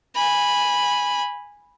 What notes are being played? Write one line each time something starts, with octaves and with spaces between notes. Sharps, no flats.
G#5 B5